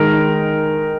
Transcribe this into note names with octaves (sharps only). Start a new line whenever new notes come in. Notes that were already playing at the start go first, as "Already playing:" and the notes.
Already playing: D#3 G#3 D#4 A#4